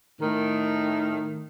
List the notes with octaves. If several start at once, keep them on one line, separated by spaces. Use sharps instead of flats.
A2 D#3